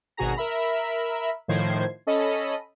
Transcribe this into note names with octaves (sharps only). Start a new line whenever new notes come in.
G#1 B2 F#4 G#4 A#5
A#4 E5 B5
A2 D#3 F3 C5 G#6 C7
C#4 A4 D#5 B5 D#7